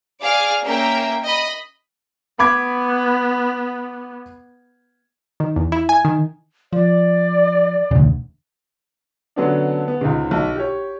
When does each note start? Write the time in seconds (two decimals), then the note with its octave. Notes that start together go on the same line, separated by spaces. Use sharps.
0.21 G#4 D5 F5 D6 F6
0.63 A#3 C#4 A#4 E5 G5
1.25 D#5 B5
2.39 B3 B5 D6 G#6
5.40 D#3
5.56 E2
5.72 E4
5.89 G#5
6.05 D#3
6.73 F3 D5
7.91 E1 D2 C#3
9.36 D3 F#3 B3 C#4 D4
9.88 B3
10.01 C#2 G#2 C#3
10.31 B1
10.56 G4 C#5